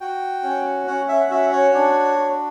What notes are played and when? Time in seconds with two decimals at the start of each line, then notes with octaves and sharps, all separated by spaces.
0.01 F#4 G5
0.43 C#4
0.87 C#4 F#5
1.09 E5
1.21 F#5
1.30 F#4 E5
1.52 C#5
1.74 D4
2.18 F#4